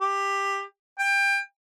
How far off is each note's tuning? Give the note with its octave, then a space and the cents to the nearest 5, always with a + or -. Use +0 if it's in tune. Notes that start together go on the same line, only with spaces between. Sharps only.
G4 +15
G5 +25